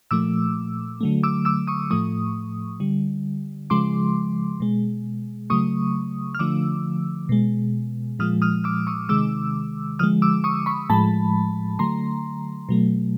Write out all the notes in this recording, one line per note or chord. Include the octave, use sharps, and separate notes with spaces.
A#2 F3 A3 D6 E6
D3 F#3 A3
D6 E6
D6 E6
C#6 D#6
A2 F3 A3 C#6 D#6
D3 G3
C#3 F3 G#3 C6 D6
B2 G#3
C#3 F#3 A3 C#6 D#6
F6
D3 F3 A3 D6 E6
B2 G#3
A#2 F3 G#3 D#6 F6
D#6 F6
D6 E6
C#6 D#6
C3 D#3 G#3 D6 E6
D3 F3 G#3 D#6 F6
D6 E6
C#6 D#6
B5 C#6
A2 F3 G#3 A5 B5
D3 F#3 A3 A#5 C6
B2 F#3 A3